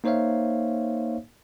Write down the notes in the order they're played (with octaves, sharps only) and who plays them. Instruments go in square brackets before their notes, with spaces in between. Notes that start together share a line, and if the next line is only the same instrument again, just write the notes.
[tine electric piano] A#3 D#4 C5 C#5 E5 F5